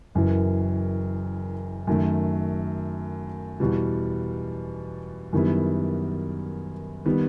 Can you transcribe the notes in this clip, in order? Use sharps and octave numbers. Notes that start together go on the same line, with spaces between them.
F#1 F#2 E3
F#2 D#3 A3
E2 B2 G3
F#2 D#3 G3 B3 E4
D#3 G3 B3